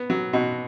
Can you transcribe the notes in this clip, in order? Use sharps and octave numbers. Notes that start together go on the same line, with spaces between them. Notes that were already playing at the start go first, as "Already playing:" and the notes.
Already playing: B3
F#3
B2